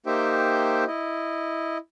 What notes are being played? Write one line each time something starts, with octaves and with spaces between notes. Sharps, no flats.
A#3 D#4 G4 C5 E5 G5
E4 D#5